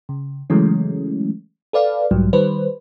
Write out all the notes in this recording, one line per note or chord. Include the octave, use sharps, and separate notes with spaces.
C#3
C#3 E3 F#3 G#3 A3 C#4
A4 B4 D5 F5
B1 G#2 F#3 G3
D#3 G3 B4 C5